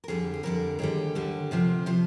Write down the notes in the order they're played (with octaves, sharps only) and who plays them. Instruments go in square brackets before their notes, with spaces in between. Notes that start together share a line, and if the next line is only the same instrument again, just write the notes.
[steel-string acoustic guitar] A#4
F2 D3 G3 G#4
G#4
F2 D3 G3 A#4
D#2 D3 G3 G#4
D#2 D3 G3
D2 C3 F3
C3 F3